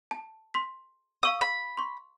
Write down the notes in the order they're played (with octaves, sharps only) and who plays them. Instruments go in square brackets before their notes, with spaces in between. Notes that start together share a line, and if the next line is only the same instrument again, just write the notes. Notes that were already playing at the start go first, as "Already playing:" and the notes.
[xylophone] A5
C6 B6
[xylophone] F5 C#6 E6 [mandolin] D#6
[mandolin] B5
[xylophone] C6 C#6